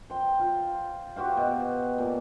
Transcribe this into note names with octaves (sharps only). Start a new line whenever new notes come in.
C5 G5
F4
F#4 G4 C5 F5
B2
A#2